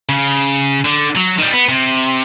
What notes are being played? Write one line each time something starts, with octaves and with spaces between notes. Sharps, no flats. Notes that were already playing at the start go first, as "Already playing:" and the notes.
C#3
D3
F#3
D#3 G3
B3
C3